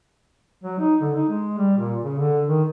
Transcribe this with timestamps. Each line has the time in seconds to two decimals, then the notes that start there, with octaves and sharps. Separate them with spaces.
0.64 F#3
0.79 D#4
1.01 D3
1.16 D#4
1.30 G#3
1.58 G3
1.78 A#2
2.03 C#3
2.19 D3
2.47 D#3